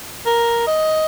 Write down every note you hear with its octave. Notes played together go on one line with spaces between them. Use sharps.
A#4
D#5